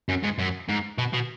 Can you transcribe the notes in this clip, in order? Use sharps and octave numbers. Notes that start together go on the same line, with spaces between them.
F#2
G#2
F#2
G#2
B2
B2